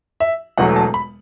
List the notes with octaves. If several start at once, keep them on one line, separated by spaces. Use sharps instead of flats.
E5
E1 E2 B2 F#3 A3 F#5
A5
B5